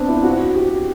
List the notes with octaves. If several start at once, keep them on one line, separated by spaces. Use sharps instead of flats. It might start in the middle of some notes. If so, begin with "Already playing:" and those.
Already playing: B3 C4 D4
E4
F#4
F#4
G4